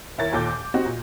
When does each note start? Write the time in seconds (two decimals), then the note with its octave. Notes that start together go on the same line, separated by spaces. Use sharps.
0.18 D#2 E4 A#4 C#5 A6
0.32 D#2 A#2 A4 G5 D6 G6
0.53 D6
0.74 C4 D#4 F#4 G4
0.86 A#2